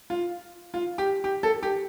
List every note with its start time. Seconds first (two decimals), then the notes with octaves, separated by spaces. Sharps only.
0.10 F4
0.74 F4
0.98 G4
1.24 G4
1.43 A4
1.63 G4